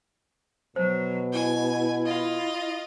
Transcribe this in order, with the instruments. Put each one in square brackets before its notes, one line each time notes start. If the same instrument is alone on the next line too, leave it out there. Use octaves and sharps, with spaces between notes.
[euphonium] B2 [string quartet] F#3 [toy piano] C5
[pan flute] E4 [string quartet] G#5
[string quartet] F4 D#5